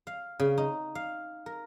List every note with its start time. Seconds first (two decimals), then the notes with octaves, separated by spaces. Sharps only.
0.07 F5
0.40 C#3
0.58 D#4
0.95 F5
1.46 A#4